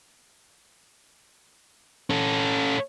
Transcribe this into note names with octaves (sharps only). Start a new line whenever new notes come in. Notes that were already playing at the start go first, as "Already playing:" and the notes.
C#4 A4